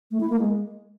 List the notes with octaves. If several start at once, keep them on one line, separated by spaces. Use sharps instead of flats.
A3
E4
A#3
G#3